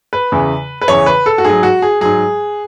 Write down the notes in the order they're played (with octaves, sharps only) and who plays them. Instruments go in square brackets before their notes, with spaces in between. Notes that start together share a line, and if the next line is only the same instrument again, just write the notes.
[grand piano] B4
E2 C#3 E3
B4
E2 C#3 E3 C#5
B4
A4
F#4
G#2 F#3 G#4
F#4
G#4
G#2 F#3 G#4